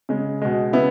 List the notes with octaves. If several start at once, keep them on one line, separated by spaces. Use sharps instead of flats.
C#3 G#3
B2 G#3
C#3 B3 E4